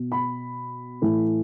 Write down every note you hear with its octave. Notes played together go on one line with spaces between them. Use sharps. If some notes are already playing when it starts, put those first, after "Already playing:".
Already playing: B2
B5
A2 E3